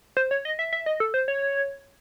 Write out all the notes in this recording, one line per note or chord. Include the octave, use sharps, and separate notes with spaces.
C5
C#5
D#5
E5
E5
D#5
A4
C5
C#5